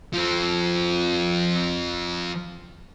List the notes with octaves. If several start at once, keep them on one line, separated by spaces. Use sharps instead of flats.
F3 C4